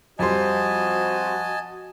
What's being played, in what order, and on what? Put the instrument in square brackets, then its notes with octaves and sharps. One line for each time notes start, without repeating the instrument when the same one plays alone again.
[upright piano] F2 G3 C5 [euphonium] F#4 [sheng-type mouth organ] D#5 G#5 A5